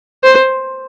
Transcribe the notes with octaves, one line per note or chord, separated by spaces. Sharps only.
C5